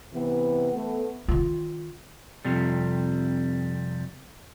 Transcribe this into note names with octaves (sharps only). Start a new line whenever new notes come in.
C3 E3 B3
A3 B3
D#3 F4
F2 C3 G3